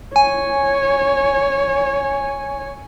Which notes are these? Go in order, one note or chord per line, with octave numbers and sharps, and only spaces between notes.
C#5 G#5